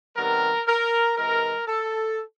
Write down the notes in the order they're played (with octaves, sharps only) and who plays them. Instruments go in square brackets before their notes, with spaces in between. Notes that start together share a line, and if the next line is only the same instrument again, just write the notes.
[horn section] C3 D#3 G3 B3 A#4
A#4
C3 E3 G#3 A#4
A4